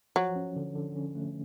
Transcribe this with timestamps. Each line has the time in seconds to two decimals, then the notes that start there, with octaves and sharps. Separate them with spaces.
0.16 F3 F#3
0.36 C#4
0.56 D3
0.75 D3
0.96 C#4
1.15 A3